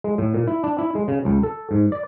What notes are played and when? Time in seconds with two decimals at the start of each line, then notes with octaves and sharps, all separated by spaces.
0.04 G#3
0.18 A2
0.34 A#2
0.47 E4
0.64 D4
0.79 E4
0.95 G#3
1.08 C#3
1.25 C#2
1.43 A4
1.71 G#2
1.92 D5